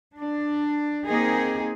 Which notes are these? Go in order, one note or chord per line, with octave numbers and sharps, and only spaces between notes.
D4
A#3 C4 D#4 G#4